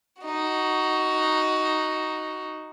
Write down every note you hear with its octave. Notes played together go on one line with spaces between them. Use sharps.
D#4 F#4